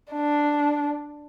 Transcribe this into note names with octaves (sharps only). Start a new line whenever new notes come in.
D4